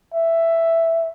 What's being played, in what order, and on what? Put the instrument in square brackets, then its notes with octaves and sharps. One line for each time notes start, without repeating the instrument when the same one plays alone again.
[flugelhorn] E5